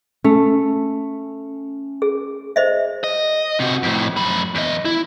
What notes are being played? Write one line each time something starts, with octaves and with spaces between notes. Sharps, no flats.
A3 C#4
G#4
C5 D#5 E5
D#5
C3 F#4
F2 A2
F#2 B5
E2 D#5
E4